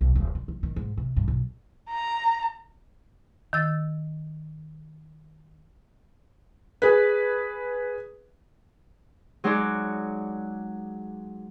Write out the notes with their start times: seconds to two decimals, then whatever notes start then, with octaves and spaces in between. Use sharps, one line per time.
0.01 B1
0.15 D#1
0.35 D3
0.48 D#3
0.63 D#3
0.76 G#2
0.97 C3
1.16 G2
1.28 B1
1.90 A#5
3.53 D#3 E6 A6
6.82 G#4 B4
9.44 F#3 G#3 D#4 F#4 D5